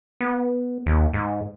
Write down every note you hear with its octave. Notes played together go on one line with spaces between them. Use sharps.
B3
D#2
G#2